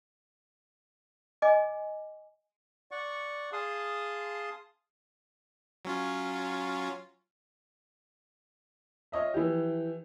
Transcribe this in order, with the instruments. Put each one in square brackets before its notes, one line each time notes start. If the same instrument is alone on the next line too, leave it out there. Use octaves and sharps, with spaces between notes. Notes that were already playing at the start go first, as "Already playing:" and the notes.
[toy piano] D#5 G#5 D6
[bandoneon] D5 F#5 C#6
G#4 F5 A5 C6 D#6
[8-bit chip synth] F#3 C#4 F4
[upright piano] F4 C#5 D#5 E5
E3 F3 G4